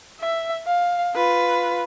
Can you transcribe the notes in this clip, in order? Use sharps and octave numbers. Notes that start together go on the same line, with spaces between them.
E5
F5
F4 B4